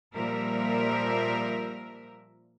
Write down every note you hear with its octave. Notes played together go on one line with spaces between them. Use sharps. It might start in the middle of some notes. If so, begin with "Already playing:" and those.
A#2 F3 G3 A#4 E5